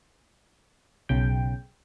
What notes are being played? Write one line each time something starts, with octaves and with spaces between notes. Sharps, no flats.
B1 C#3 G5